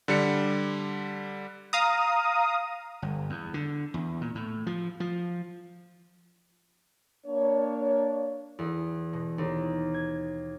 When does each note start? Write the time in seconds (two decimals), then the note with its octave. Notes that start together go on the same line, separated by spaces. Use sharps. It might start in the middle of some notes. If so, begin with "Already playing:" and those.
0.08 D3 G3 C#7
1.73 F5 A#5 D#6
3.02 G1
3.30 E2
3.54 D3
3.94 E2
4.21 A#2
4.35 A2
4.67 F3
5.00 F3
7.26 A#3 D4 C#5
8.59 E2
9.13 B2
9.38 D#2
9.94 G#6